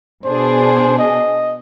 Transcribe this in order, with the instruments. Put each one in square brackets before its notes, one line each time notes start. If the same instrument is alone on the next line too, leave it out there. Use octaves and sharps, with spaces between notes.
[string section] B2 D4 G#4 [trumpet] C5
[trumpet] D#5